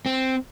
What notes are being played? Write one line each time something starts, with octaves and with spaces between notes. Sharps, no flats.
C4